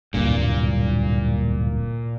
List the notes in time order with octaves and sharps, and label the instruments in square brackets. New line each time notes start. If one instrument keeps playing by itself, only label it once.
[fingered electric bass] D1 C2 G2 [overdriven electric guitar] A#2